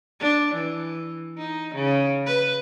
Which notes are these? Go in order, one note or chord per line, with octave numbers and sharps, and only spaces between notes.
D4
E3
D#4
C#3
B4